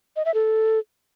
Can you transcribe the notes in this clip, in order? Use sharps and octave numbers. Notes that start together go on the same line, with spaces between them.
D#5
E5
A4